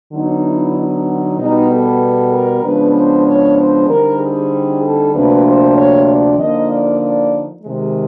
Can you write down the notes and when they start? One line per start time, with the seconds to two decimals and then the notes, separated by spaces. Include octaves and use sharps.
0.13 D3 F#3 B3 D#4
0.45 E4
0.76 D#4
1.38 B2 G3 B3 D#4
1.69 A4
2.32 A#4
2.63 C#3 F3 G#3 B3 D4 B4
2.95 C5
3.26 C#5
3.57 C5
3.88 D3 G3 C4 D#4 A#4
4.20 G#4
4.83 A4
5.13 D2 C3 F3 A#3 D4 B4
5.44 C5
5.76 C#5
6.08 D5
6.39 D3 F3 A#3 D#4 D#5
6.69 D5
7.01 D5
7.63 C3 D#3 G#3